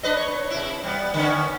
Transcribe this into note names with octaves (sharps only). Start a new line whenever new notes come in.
D4 B4 D#5
C#5
C3 E4
G3 B3
D3 B3 C#4